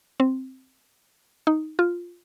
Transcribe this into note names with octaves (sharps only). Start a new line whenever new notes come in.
C4
D#4
F4